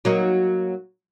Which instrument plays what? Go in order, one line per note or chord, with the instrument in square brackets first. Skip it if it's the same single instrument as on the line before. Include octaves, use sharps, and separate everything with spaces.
[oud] F#3 A#3 D#4